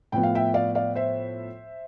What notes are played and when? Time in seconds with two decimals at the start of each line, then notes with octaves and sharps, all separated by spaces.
0.12 A2 F3 B3 G5
0.23 F5
0.35 E5 G5
0.54 D5 F5
0.75 D5 F5
0.95 C5 E5